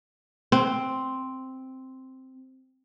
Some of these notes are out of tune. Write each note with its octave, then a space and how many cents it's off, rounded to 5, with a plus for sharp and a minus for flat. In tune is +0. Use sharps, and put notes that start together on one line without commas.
C4 +0